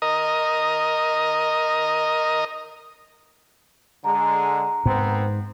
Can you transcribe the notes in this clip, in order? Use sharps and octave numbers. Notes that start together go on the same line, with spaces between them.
A#4 D#5
D3 G#3 A#5
G#2 D#3 B3 C4